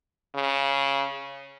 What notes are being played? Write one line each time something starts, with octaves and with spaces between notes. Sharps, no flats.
C#3